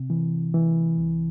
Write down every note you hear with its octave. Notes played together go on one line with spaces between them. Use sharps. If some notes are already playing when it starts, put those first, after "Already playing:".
Already playing: C3
E3
E3
C2